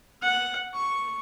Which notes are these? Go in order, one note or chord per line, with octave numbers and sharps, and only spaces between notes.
F#5
C#6